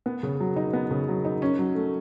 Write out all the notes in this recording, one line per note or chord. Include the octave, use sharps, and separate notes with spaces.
B3
C#3
F#3
D#4
B3
C#3
F#3
D#4
C#4
F#3
A3